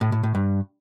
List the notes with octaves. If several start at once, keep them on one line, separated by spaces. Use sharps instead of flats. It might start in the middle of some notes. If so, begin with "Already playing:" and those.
A2
A2
A2
G2